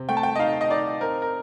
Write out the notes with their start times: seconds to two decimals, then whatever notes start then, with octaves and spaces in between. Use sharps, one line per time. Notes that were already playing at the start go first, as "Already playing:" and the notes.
Already playing: C3
0.09 A3 G5
0.17 A5
0.23 G5
0.36 D#5
0.39 D#4 F5
0.61 D#5
0.70 D#4 D5
1.00 C4 A#4
1.22 A#4